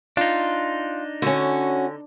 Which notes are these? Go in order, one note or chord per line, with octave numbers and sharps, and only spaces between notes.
D4 D#4 F4
D3 C#4 F#4